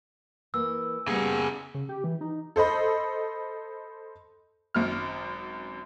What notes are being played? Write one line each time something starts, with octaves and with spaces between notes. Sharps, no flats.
E3 A#3 E6
A#2 C#3 G3 B3 G#4 F#5
C#3
G4
E3
D#4
A4 C5 D#5 B5
G#1 F#2 F6